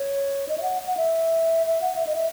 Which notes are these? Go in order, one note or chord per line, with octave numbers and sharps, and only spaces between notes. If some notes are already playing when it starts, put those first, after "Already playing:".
Already playing: C#5
D#5
E5
F#5
F#5
E5
E5
F#5
E5
D#5
E5